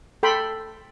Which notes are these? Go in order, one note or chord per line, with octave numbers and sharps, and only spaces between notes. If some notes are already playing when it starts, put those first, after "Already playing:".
A4 G5 B5 C6